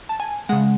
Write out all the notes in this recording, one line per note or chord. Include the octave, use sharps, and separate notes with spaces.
A5
G#5
C#3 G#3 F#5